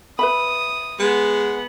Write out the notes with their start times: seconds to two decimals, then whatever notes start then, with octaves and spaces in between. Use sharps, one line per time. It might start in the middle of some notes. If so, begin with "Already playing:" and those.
0.19 B4 E5 B5 D#6
0.99 G#3 B3 F#5